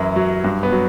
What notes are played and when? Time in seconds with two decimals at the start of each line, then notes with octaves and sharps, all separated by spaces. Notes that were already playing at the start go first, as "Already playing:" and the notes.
Already playing: F#2 E3 E4
0.16 F#3
0.44 G2
0.63 B3
0.72 F#3